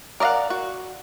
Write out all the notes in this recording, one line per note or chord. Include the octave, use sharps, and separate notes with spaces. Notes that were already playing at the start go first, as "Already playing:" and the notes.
A#4 D5 D#5 F5 F#5
F#4